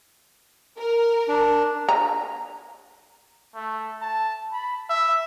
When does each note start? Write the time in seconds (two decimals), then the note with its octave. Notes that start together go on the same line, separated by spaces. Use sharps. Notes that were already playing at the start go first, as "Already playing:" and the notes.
0.78 A#4
1.28 D4
1.89 A#5
3.55 A3
4.01 A5
4.52 B5
4.90 E5